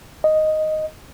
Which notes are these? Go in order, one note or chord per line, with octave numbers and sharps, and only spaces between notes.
D#5